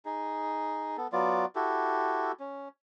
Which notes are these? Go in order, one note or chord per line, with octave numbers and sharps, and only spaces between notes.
D#4 G#4
B3 A4
F#3 B3 F4 D5
E4 F#4 G4 A4
C#4